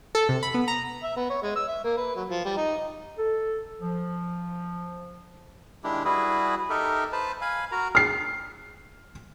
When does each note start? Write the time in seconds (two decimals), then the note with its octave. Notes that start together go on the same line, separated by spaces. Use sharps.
0.15 A4
0.29 C3
0.43 B5
0.54 B3
0.68 A#5
1.03 E5
1.17 B3
1.30 C#5
1.43 G#3
1.56 E6
1.68 E5
1.84 A#3
1.97 B4
2.15 F#3
2.29 F3
2.45 G3
2.57 D#4
3.17 A4
3.81 F3
5.84 D#3 G#3 D4 E4 G4
6.05 G3 E4 F#4 G#4 B4
6.70 D#4 G4 A4 A#4 E5
7.12 B4 C5 A5
7.41 F5 G#5 B5
7.72 F#4 A#4 A#5
7.95 F6 C7